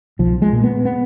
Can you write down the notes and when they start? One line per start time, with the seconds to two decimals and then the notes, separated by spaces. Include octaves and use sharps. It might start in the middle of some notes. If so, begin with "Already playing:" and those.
0.19 B1 F3
0.42 G#3
0.53 A#2
0.63 B3
0.85 B3